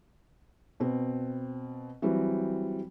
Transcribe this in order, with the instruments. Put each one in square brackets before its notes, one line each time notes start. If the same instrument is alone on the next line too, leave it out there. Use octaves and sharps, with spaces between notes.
[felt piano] B2 C4
E3 F#3 G3 C4